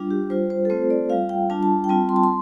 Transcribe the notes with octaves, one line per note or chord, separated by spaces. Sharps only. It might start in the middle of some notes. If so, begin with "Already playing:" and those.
Already playing: G3 D4 F4
G4
G3 F4 C5
C5
A4
A3 C4 F4 C5
D5
G3 F4 F5
G5
G3 D4 F4 A5
A5
G5
G3 C4 F4 A5
C6
A5
C6